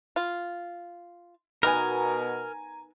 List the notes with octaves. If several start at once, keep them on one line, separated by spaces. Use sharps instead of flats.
F4
B2 D#3 B3 A#4 G#5 A#5